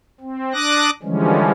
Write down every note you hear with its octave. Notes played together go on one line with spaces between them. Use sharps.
C4
D4 D6 D#6 F#6 A#6
D3 E3 F3 G3 G#3 C#4